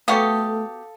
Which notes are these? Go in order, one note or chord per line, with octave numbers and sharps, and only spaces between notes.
A3 B3 F#4 G4 A4 F5 D#6